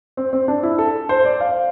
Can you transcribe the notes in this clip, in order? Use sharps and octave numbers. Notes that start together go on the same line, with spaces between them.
C4
C4
D4
E4
A4
C5
D5
F5